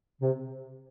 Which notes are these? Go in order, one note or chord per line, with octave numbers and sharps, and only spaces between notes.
C3